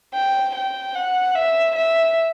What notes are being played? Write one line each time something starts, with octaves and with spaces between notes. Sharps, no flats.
G5
G5
F#5
E5
E5